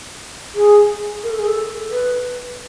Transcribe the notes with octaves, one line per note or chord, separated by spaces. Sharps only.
G#4
A#4
A4
G#4
A4
B4